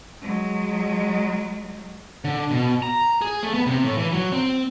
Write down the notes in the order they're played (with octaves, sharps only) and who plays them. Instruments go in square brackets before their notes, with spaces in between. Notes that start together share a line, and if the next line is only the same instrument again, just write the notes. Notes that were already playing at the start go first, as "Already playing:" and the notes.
[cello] F#3 G#3
[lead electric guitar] D3
B2
A#5
G#4
A3
B3
C3
A2
E3
F#3
C4